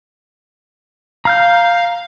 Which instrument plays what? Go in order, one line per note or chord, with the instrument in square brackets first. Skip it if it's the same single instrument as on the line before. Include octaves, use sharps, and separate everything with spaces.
[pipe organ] F5 [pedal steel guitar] A#5 F6 G6